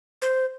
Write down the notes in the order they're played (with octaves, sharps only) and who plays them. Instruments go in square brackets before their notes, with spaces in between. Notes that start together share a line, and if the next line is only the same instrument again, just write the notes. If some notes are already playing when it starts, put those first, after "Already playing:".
[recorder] C5